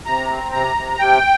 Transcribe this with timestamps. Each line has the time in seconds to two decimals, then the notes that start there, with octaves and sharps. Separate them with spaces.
0.06 C3 A#5
0.30 C4
0.52 C3 A#5
0.76 C3
0.99 C3 G5